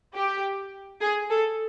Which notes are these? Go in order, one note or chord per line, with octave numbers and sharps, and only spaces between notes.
G4
G#4
A4